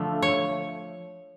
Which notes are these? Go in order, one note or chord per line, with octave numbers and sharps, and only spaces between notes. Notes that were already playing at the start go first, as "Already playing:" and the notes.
Already playing: D3 F3 A3
C#5